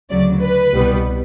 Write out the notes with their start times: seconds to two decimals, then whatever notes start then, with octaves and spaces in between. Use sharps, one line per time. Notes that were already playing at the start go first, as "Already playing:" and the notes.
0.10 D2 C#3 F#3 D5
0.42 B4
0.73 C2 B2 G3 B3